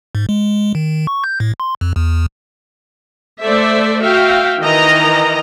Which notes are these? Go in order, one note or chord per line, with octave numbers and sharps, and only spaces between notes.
G#2
G#3
D#3
C#6
G6
A2
C6
F2
E2
A3 A4 C5 D5 E5
F#4 E5 F5 G5
D#3 E3 A#4 D#5 A#5